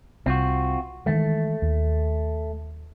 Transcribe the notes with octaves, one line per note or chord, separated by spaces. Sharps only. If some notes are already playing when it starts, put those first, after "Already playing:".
C2 C4 F4 F#4
D#3 E3 G#3 A3
D#2